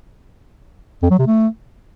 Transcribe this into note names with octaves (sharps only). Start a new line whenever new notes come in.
F2
F#3
C3
A3